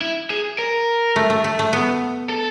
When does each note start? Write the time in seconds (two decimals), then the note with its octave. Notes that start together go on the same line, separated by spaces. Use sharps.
0.02 E4
0.30 G#4
0.59 A#4
1.16 A3
1.30 A3
1.44 A3
1.59 A3
1.73 B3
2.29 A4